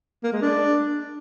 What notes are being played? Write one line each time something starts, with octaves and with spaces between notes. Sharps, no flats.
A#3
G#3
D4